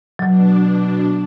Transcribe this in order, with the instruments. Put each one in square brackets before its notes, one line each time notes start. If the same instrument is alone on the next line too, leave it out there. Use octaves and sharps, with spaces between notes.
[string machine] B2 D4 [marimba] F#3